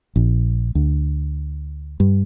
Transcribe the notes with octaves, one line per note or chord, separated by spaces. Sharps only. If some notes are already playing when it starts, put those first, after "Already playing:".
A#1
D2
G2